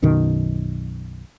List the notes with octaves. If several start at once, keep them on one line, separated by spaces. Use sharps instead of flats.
B1 F#2 B2 D#3